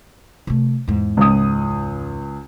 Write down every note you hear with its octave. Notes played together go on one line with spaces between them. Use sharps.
C3 A3
E2 G#2
C#2 D#6